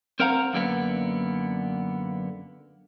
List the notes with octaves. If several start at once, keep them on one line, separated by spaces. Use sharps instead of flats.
C4 A#4 C5 F5 F#5 A#5
F#2 D3 A#3 B3